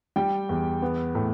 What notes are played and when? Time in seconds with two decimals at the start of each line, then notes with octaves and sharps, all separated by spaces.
0.16 G3 G5
0.49 E2
0.82 B3
1.15 A2